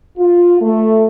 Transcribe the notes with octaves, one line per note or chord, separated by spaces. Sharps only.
F4
A3